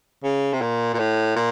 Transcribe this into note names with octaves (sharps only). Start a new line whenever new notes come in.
C#3
C3
A#2
A#2
A2
A#2